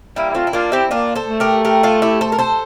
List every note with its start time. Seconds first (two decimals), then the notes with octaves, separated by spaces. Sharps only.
0.16 G3 A#3 E4
0.31 E4
0.35 A3 C4 F4
0.47 E4
0.53 A#3 D4 F4
0.72 C4 E4 G4
0.91 A#3 D4 F4
1.15 A4 C5
1.27 A3
1.40 G4 A#4
1.65 G4 A#4
1.83 F4 A4
2.02 E4 G4
2.21 A4 C5
2.32 A#4
2.38 A4 C5